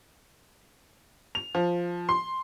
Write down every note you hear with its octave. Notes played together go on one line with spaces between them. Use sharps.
F7
F3
C6